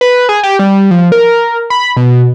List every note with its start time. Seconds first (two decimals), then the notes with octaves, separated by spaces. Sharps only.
0.01 B4
0.29 G#4
0.43 G4
0.59 G3
0.91 F3
1.12 A#4
1.70 B5
1.97 B2